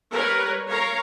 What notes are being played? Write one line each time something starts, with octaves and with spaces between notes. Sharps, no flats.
G3 A#4 B4 C#5
A#4 C#5 F5 A#5